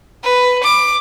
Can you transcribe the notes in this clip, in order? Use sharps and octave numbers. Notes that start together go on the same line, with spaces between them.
B4
D6